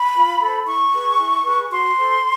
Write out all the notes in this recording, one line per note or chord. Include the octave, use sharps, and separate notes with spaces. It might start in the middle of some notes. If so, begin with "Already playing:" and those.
Already playing: B5
F4
A4 C5
E4 C#6
G#4 B4
E4
G#4 B4
F#4 C6
A4 C5